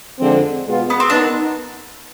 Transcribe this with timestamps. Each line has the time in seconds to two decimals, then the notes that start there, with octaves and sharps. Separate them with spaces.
0.20 F2 D3 F3 G#3 C4
0.65 B2 G#3 B3 F4
0.90 B3
1.00 C4
1.10 D#3 B3 D4 D#4